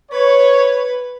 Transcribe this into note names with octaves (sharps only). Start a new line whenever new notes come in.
B4 C#5